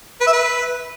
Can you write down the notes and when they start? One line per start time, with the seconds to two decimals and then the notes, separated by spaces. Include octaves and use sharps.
0.21 B4
0.27 E5
0.33 B4